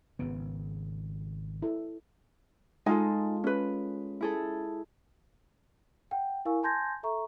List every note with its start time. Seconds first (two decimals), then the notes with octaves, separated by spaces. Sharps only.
0.19 G#1 C#3 B3
1.62 E4 A4
2.86 G#3 D#4 F4 A4 G#5
3.44 C#4 B4
4.21 E4 G#4 A4
6.11 F#5 G5
6.45 E4 A#4 F5 G#5 C#6 E6
6.63 G#5 A5 C6 G6 G#6 A#6
7.03 A4 E5 A#5 C#6